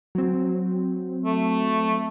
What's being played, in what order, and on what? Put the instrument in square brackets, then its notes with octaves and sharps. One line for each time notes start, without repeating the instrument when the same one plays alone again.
[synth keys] F#3 C4
[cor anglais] A3